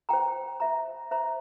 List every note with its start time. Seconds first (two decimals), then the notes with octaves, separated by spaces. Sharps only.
0.09 C5 G5 A#5
0.60 C5 E5 A#5
1.11 C5 E5 A#5